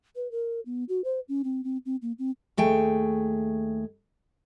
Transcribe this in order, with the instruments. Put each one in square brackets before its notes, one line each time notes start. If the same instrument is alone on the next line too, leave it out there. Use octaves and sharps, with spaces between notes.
[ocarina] B4
A#4
B3
F#4
C5
C#4
C4
C4
C4
A#3
C4
[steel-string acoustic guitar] D#2 A3 G#4 G5